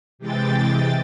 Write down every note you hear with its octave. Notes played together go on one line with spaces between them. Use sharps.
C3 E3 G#3 G5 A6